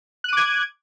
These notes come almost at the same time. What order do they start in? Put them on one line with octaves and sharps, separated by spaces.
F#6 D#7 D6 G#6